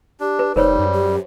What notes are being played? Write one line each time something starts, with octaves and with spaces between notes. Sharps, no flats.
D4 G4
B4
F1 G3 D#4 A#4 C5 C#5
F#2
G4